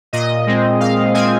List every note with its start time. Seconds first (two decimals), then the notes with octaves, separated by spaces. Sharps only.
0.13 A#2 D#5
0.47 G#3 C4
0.80 A#2 F5
1.14 G#3 C4 G#5